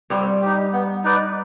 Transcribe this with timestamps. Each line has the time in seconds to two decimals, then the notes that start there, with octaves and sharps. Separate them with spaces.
0.10 G2 G3 C4
0.42 D#4 G4
0.73 B3
1.04 D#4 B4 D5